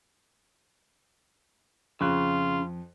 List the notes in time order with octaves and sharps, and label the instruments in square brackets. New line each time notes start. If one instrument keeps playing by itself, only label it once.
[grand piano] F2 F#6 [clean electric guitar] C#3 [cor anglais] F4